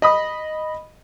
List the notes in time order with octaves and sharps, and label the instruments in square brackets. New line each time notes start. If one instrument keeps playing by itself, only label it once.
[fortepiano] D#5 B5 D#6